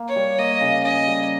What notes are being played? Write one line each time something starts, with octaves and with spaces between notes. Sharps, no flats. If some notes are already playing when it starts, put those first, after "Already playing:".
Already playing: A#3
C#5
G3
A#3 D#5
C#3
C#4 D#5
G3